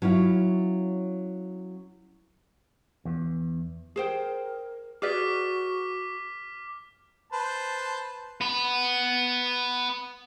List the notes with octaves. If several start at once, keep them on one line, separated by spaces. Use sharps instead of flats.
F#3 C#4 E4 F4
E2
G#4 A#4 C5 G5
F#4 G#4 B4 D5 D6 F6 B6
B4 C5 A5
B3 B5